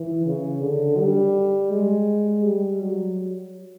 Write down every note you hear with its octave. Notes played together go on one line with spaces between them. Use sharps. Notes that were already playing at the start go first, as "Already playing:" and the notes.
Already playing: E3
C#3
D3
G3
G#3
G3
F#3